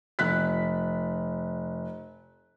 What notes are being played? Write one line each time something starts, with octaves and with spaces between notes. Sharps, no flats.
F1 F#6 B6